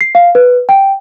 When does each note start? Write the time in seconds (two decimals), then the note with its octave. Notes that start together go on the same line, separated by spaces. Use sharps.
0.01 C7
0.15 F5
0.35 B4
0.69 G5